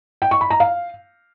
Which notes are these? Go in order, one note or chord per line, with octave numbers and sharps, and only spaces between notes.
G5
C#6
B5
A#5
F5